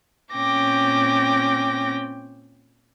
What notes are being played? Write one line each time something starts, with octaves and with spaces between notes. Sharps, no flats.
A#2 C4 C#4 G5 D6 A#6